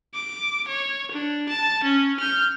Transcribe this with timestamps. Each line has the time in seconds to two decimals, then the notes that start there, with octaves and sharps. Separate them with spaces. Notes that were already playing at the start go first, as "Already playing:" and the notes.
0.14 D6
0.68 C#5
1.11 D4
1.48 A5
1.83 C#4
2.20 F6 G6